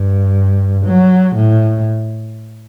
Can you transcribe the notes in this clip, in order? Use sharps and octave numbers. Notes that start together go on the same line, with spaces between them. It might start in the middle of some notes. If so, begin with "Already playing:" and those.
Already playing: G2
F#3
A2